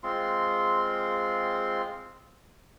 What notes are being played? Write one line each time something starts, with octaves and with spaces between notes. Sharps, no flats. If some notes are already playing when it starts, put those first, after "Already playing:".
G#3 C4 F4 C6